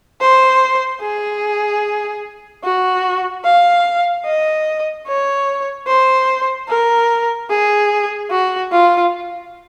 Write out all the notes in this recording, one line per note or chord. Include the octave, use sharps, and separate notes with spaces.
C5
G#4
F#4
F5
D#5
C#5
C5
A#4
G#4
F#4
F4